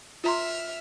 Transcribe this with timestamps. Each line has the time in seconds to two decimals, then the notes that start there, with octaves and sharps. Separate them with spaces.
0.24 F4 E5 A#5 C6 F6